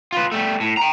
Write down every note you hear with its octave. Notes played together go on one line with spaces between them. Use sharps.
F4 B4
G3 A3
A2
G5 A#5